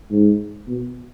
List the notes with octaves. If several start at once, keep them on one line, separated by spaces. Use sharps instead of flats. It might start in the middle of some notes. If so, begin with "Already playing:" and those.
G#2
B2